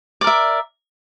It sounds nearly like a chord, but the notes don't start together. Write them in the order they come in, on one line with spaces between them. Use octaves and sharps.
D5 A#4 E5